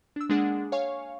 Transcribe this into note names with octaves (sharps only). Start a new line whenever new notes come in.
D4 E6
G#3 A#3 D4 G#4 F#5
C#5 F5 G#5 C#6